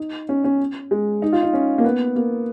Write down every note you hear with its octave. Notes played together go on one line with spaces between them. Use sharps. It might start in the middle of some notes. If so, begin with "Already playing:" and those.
Already playing: D#4
C#4
C#4
G#3
D#4
F4
D#4
C#4
A#3
B3
A#3